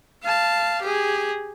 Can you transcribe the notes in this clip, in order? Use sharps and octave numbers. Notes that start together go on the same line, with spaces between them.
F5 A5
G4 G#4